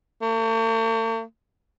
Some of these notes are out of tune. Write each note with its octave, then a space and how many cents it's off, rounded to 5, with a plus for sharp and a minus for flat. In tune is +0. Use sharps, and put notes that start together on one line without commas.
A3 +45